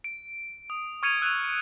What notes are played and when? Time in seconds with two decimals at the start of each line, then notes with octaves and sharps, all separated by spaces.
0.04 D7
0.70 D#6
1.03 C#6 F6 G#6 C#7 D#7 F7
1.22 E6 F#6 G#6 D#7 F7